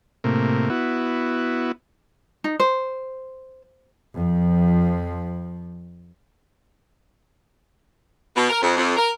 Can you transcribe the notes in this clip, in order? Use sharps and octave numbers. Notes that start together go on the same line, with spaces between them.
A2 C3 A#3
B3 E4 F#4
D#4
C5
F2 F3
B2
A#4
F2
F2
A#4